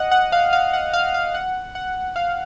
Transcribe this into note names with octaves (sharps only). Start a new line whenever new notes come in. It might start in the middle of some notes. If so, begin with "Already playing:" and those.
Already playing: D#5 F#5
F#5
F5
F5
F#5
F5
F5
F#5
F#5
F5